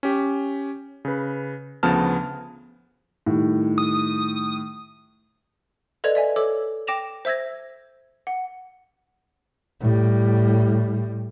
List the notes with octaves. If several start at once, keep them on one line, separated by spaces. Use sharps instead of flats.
C#4 G4
C#3 B4
D2 C#3 F3 B3 A5 F6
A2 D#3 G3
D#6
A4 B4 D5 D#5 G#6 F7
D5 E5 G#5
A4 C#5 D6 E6
G5 D6 A#6 E7 F7
C5 E5 E6 G#6 A#6
F#5
A2 G3